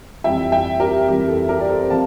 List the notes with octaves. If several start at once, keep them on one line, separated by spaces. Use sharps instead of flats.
F2 E3 G3 E5 G5
E5 G5
G4 A#4
F2 E3 G3 G4
A4
G4 A#4
D5
A4 C5
C3 F3 F5 A5